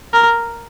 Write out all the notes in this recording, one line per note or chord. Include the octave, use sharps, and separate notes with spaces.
A#4